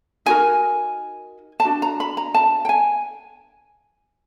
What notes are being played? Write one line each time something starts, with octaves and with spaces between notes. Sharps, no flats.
D#4 F#4 A#4 G#5
A5
D4 F#4
A#5
B5
A#5
A5
G5
G#5